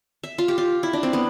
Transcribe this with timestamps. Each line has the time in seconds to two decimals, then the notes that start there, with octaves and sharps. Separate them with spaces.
0.23 E5
0.38 F4
0.48 G4
0.58 F4
0.83 E4
0.93 D4
1.03 C4
1.13 B3